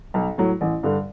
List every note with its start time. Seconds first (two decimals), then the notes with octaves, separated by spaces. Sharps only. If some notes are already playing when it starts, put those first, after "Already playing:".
0.14 B1
0.38 A2 F#3
0.61 A1
0.83 G2 D3